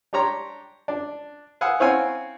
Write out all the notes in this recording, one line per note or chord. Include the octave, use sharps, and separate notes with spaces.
D4 G4 C#5 A#5 C6
D4
F5 F#5 G#5 D#6 E6
C4 E4 C#5 F5 F#5 G#5